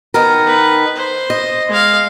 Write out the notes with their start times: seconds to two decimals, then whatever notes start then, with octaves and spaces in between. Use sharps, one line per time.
0.14 D#3 B3 A#4
0.46 B4
0.96 C5
1.30 D#5
1.69 G#3 F5